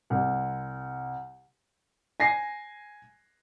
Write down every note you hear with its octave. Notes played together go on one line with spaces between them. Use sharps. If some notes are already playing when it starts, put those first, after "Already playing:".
C2
G#5 A#6 C7